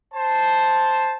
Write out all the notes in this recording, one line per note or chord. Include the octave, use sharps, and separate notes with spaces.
C5 A5